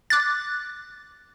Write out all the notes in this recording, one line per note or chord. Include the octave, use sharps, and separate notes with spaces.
D6 F#6 A6